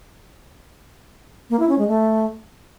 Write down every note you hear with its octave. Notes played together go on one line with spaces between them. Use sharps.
A#3
E4
C#4
G#3
A3